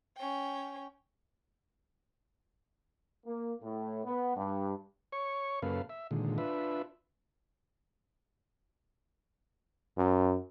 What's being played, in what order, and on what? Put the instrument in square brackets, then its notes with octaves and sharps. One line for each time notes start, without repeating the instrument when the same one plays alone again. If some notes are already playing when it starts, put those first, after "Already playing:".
[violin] C#4 G5
[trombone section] A#3
A2
B3
G2
[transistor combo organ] C#5 C#6
F#2 C#3 A#3 A4 B4 F5
E5
A#2 D3 D#3 G#3
D4 F4 B4 E5
[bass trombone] F#2